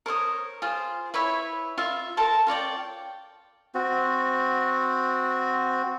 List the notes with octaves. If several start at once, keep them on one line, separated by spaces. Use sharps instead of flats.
A#4 C5 C#5 D#6
F4 G#4 C5
E4 B4 C#5 E5
F4 E5
A4 A#4 C5 A5
F4 C#5 D5 G5
C4 F#4